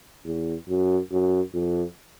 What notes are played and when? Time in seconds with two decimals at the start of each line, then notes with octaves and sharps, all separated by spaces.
0.25 E2
0.69 F#2
1.11 F#2
1.54 F2